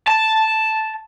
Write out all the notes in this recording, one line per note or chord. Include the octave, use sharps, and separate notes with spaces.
A5